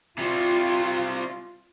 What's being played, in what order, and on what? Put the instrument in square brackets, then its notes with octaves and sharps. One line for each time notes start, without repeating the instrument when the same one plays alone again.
[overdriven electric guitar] C3 G3 [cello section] F4